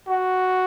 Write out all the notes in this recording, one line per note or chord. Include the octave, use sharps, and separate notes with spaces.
F#4